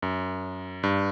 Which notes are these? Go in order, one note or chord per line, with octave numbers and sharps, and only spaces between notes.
F#2
G2